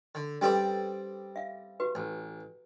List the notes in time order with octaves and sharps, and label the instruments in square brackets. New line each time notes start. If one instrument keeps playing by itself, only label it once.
[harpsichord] D3
[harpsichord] G3 C4 D5 [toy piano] C#4 A4 B4
[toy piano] E5 F5
F#4 G4 B4
[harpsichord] A1